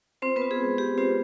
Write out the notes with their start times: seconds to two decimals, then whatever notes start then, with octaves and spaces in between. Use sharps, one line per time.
0.22 C4 F4 C5
0.36 B3 B4
0.42 F4
0.51 G#4
0.60 G#3
0.78 F4 G4
0.98 C4 F4 C5